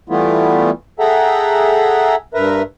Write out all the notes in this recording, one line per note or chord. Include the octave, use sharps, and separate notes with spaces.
E3 G3 A3 B3 E4 F4
G#4 A4 E5 F#5 G5 A#5
G2 A#4 B4 E5 A#5